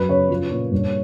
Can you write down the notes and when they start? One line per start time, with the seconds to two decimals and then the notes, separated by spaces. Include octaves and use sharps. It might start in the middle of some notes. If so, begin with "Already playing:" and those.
Already playing: F#2 B4
0.09 C#3 C#5
0.29 F3
0.50 A#2
0.71 G2